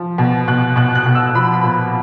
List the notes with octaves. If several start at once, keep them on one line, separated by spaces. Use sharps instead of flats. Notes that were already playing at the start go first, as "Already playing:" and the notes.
Already playing: F3
B2
B2 F#6
B2 F#6
F#6
B2
E6
F3 B5
B5
A#2